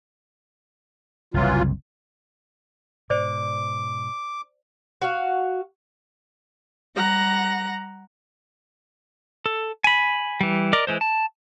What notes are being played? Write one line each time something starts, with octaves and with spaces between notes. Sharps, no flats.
F#1 C2 E3 F#3 F4
G#2 B2 C5 D5 D6
F#4 F5
G3 F#5 A#5 A#6
A4
G#5 B5
E3 G3
A#4 D5 D#5 D6
E3 G#3 C5
A5